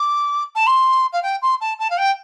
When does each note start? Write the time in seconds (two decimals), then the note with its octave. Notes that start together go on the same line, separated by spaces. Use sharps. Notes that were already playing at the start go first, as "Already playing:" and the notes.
Already playing: D6
0.55 A5
0.67 C6
1.12 F5
1.22 G5
1.42 C6
1.60 A5
1.79 A5
1.90 F5
1.97 G5